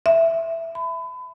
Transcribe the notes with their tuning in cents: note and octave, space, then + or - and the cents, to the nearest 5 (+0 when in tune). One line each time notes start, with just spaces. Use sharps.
E5 +5
B5 +30